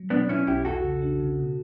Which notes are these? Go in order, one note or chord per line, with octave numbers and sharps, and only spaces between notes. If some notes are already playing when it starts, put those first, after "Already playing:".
Already playing: F#3
B2 B3 D4
B2 C#4 E4
B1 E4 G4
E2 F#4 A4
C#3
D4
C#3
B2